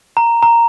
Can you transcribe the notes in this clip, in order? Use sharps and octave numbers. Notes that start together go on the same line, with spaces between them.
A#5
A#5